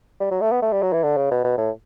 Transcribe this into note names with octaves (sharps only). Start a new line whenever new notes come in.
G3
F#3
A3
B3
A3
G3
F#3
E3
D3
C#3
B2
B2
A2